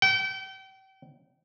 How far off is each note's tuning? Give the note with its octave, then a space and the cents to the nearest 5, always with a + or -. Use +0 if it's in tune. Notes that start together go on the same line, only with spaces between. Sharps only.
G5 -35